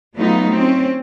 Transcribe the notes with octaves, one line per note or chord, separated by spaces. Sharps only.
F#3 A3 B3 D#4 F4
C4 C#4